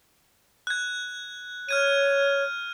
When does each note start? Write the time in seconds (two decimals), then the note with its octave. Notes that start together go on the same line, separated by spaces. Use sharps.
0.67 F#6 G#6
1.69 C#5 F6 G#6 D#7